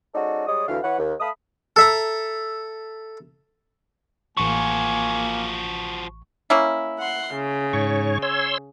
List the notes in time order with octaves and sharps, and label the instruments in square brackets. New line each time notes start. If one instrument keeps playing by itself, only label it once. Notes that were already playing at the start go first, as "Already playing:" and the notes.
[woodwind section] G#3 C#4 D#4 F#4 A4 D5
G3 G#3 C#5 D5 D#6
D2 E3 F5
E3 B4 C#5 F#5
D#2
A3 F5 A5 B5 D#6
[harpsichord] A4 E5 A#5
[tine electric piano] A1 C#6 [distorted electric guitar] F3 F#4 [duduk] A#3 [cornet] G#5
[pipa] A#3 C#4 E4
[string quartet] F#5 C6
C#3
[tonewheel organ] G#2 C#5 C#6
C#5 C6 E6